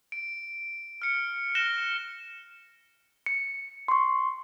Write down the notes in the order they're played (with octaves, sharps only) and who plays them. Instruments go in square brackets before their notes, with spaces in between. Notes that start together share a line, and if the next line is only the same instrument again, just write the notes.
[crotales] D7
F6 C#7
F6 F#6 A#6 E7 G7
[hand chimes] C#7
C6 C#6